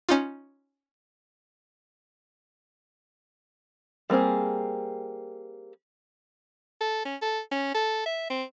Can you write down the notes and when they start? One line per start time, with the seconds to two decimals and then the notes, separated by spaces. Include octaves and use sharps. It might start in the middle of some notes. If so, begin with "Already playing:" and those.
0.09 C#4 D#4 F4
4.10 G3 A#3 C4 G#4
6.81 A4
7.05 C#4
7.22 A4
7.52 C#4
7.74 A4
8.06 E5
8.30 C4